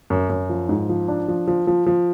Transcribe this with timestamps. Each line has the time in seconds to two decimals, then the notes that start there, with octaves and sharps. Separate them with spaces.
0.10 F#2
0.29 F#2
0.49 F3
0.69 G#2
0.89 F3
1.08 D4
1.28 F3
1.48 F3
1.67 F3
1.86 F3